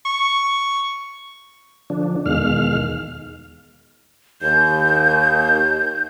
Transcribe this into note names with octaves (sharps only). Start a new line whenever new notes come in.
C#6
D3 F3 D4
E2 B2 D#3 G#3 F5 F6
D#2 G6